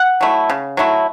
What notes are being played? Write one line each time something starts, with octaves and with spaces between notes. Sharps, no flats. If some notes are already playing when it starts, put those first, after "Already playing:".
Already playing: F#5
F#3 A3 E4
C#3
F#3 A3 E4